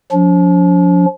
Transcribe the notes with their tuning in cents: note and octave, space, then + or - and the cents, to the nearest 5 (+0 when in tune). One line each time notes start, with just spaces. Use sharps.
F3 +30 D4 -40